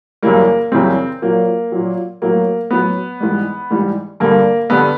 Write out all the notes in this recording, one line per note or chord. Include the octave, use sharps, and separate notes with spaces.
F#2 C#3 E3 G3 A#3
F#2 C#3 E3 G3 C4
A#2 F#3 A#3
A#2 F#3
A2 F#3 A#3
A2 F#3 B3
G#2 E3 G3
G#2 E3 G3
G2 D3 G3 A#3
G2 D3 G3 B3